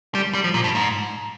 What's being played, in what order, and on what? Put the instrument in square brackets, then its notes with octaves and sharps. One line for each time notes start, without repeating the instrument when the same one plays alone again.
[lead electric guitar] G3
G3
F3
A#2
G2
G#2